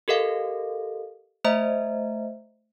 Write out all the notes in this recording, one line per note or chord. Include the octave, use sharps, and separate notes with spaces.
G4 A4 A#4 D#5 F5
A3 C5 D#5 E5 A#5